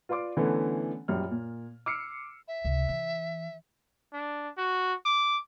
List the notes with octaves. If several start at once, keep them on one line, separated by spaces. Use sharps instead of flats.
F4 B4 D5 C6 D6
D3 E3 A3 B3 C#4
A#1 F#2 G3 C#5 F6
A#2
D6 E6 F6 C7 C#7
E5
C#2 C3
E3
D4
F#4
D6